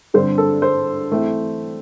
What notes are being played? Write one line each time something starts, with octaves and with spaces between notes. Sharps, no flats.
G2 D3 G3 C4 C5
A4
C5
E3 A3 C4